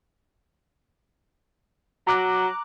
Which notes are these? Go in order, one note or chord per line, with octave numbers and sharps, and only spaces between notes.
F#3 A#5 D6 F#6